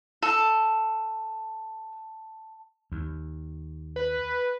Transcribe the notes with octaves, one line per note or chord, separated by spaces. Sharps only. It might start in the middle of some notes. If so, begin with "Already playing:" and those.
A4 A5
D#2
B4